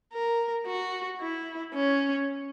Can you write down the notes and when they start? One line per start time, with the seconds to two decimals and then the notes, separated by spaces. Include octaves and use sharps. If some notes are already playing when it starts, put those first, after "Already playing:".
0.13 A#4
0.66 F#4
1.20 E4
1.74 C#4